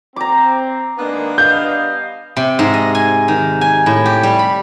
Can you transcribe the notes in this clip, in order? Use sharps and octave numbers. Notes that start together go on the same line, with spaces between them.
C4 A#5 D6
D#3 G#3 A#3 B3 D4
G2 D#5 F5 G6
C3
G#2
D#5
G#5
D#3
G#5
A2
G4
G3
B5